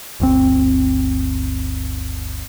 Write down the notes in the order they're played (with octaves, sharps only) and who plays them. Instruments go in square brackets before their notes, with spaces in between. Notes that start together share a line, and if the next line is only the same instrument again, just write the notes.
[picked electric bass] G1 D2 C4